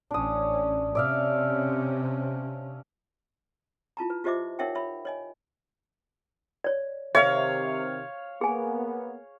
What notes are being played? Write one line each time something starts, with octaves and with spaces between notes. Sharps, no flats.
A1 C#4 D4 D#6
C3 C#4 D5 E5 F5
E4 F4 A5 A#5
B4
F4 G4 C5 D#5 E5 D6
D#4 A#4 C#5 E5 F#5 G5
C#5 E5 B5
C#5 D#5 G#5
C#5 D5
C3 D#3 C#5 E5 F5
A#3 B3 G#4 G#5